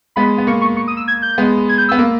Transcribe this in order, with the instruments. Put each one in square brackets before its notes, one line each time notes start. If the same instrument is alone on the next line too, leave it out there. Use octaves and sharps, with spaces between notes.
[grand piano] G#3 B3 [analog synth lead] B5
[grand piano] B3
[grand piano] A#3 [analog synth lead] C#6
[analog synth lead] C#6
C#6
D#6
E6
G#6
G6
[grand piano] G#3 B3
[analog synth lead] G#6
G6
[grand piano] B3 [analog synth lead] E6
[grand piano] A#3